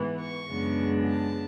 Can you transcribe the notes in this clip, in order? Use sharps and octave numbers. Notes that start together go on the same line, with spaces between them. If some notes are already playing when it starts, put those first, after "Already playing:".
Already playing: G#2 E3 B3
C#6
F#2 C#3 G#3 B3 D4
A5